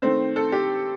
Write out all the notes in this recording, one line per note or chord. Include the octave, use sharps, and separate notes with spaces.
D#3 A3 C4 C5
A4
G4